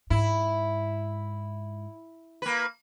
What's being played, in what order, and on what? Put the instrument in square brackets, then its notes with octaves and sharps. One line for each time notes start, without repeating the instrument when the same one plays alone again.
[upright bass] G#2 [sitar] E4
[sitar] A#3 B4